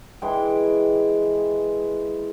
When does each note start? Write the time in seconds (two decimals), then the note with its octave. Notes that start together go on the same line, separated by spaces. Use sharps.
0.22 E3 G#3 G5